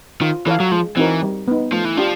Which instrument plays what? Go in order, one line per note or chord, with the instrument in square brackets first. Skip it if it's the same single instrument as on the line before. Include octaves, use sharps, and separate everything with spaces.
[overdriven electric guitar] D#3 [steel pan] F4
[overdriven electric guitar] E3 [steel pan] A4 C#5 F5
[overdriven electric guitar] F#3
[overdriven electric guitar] F3 [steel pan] G#3
[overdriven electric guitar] E3 [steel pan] C4 D#4 F#4 A#4
[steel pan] G3
B3 D#4
[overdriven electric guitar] F3 [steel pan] A3
[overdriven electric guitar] E3
[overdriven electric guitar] F3 [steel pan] D4 G4